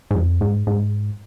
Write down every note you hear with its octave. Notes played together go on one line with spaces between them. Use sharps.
G#2
F2
G#2
G#2